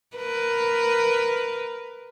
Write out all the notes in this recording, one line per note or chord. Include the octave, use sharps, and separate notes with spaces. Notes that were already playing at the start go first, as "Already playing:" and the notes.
A#4 B4